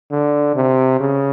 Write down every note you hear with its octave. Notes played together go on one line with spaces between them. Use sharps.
D3
C3
C#3